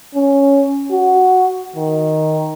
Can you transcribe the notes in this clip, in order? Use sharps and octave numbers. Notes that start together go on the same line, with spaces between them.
C#4
F#4
D#3